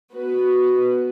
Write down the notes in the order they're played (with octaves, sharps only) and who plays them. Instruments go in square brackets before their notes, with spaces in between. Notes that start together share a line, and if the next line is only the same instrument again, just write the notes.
[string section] B3 F#4 B4